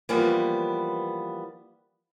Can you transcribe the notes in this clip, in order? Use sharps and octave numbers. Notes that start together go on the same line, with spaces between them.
E3 F3 G3 A#3 B3